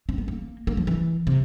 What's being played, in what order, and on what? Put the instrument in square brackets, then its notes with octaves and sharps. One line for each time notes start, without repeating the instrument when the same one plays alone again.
[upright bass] C4
B3
A#3
A#3
F3
E3
C3